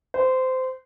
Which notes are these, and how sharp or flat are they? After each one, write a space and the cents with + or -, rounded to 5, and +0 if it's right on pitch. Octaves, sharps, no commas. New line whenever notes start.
C5 -20